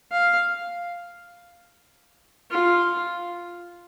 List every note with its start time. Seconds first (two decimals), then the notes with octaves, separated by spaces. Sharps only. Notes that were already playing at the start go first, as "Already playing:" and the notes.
0.12 F5
2.51 F4